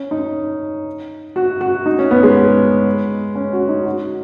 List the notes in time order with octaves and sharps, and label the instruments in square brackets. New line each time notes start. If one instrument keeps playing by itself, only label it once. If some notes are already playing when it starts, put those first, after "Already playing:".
Already playing: [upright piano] C#4
D#4
F#4
F#4
D#4
C#4
B3
G#3
C#4
F#4
D#4
F#4